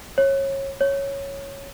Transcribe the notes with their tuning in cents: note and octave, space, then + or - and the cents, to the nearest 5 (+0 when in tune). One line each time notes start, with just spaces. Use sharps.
C#5 -25
C#5 -5